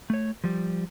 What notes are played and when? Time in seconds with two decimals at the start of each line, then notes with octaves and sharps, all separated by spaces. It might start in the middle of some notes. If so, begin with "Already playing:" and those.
0.10 A3 C#5
0.44 F3 G3